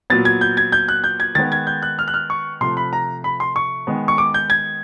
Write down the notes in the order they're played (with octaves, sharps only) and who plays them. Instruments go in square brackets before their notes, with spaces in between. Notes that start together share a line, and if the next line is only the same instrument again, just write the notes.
[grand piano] A#2 F#3 B3 A6
G#6
G6
G#6
G6
F#6
G6
G#6
D#3 G#3 B3 A6
G#6
G6
F#6
F6
F#6
F6
C#6
C3 F3 A3 C6
B5
A#5
B5
C6
C#6
D#3 G#3 B3
C#6
D6
G6
G#6